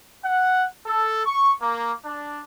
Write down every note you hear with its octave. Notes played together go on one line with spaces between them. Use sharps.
F#5
A4
C#6
A#3
D4